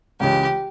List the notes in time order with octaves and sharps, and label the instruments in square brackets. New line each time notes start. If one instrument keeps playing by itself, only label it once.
[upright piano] C#2 C#3 E3 G#3 C#4 [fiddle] G4